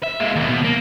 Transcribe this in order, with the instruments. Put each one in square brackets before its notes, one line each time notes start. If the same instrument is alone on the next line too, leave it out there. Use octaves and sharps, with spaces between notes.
[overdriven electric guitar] E5
G#3 A#3
D#2 B2
B2
A#3